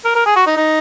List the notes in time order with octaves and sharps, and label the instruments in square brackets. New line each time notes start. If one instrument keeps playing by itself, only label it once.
[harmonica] A#4
A#4
G#4
F#4
D#4
D#4